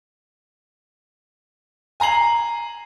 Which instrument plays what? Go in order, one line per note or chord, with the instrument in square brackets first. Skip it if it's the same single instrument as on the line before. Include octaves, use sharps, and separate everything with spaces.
[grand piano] G#5 A#5 C7 F#7